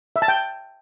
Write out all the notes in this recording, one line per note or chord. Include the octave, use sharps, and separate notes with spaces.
E5
A5
G5